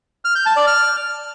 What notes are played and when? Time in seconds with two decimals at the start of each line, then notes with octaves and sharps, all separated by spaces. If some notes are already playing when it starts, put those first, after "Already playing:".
0.25 F6
0.35 G6
0.46 A5
0.56 D5
0.67 F6